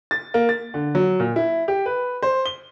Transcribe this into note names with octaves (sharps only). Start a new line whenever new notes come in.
A6
A#3
A6
D3
F#3
A#2
E4
G4
B4
C5
G7